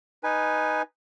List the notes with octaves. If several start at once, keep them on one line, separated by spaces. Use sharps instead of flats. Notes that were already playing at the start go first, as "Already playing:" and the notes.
D#4 B4 G#5